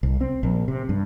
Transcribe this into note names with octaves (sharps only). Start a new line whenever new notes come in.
C2
C4
A#1
C3
G2